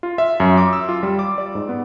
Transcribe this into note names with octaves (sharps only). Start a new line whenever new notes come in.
F4
E5
F#2
D6
E6
F4
G3
D6
D5
G#2
B3